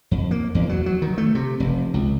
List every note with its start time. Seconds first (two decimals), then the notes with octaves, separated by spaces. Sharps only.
0.11 F2
0.31 A#3
0.55 E2
0.69 F#3
0.86 F#3
1.02 D#3
1.18 A3
1.35 C3
1.60 F1
1.94 C#2